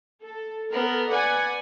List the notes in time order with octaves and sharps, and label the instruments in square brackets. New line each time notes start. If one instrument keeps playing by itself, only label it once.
[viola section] A4
[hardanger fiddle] B3 [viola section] A4 A#4
[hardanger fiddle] B4 [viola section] D5 F#5 G#5